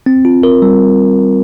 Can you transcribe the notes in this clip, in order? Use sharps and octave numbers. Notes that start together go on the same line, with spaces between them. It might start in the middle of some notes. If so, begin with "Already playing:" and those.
C4
F4
A#4
G3